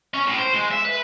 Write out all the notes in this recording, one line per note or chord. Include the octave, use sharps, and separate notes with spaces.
C#4
A2
C5
G#3
E5
B4